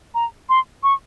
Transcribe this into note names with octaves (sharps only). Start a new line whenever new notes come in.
A#5
C6
C#6